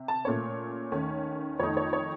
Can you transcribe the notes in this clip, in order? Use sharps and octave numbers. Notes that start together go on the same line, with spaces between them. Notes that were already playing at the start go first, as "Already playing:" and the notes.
Already playing: C3
A5
A#2 A3 C#4 C#5
D#2 D#3 A3 C#4
F2 D#3 A3 D#4 C#5
C#5
C#5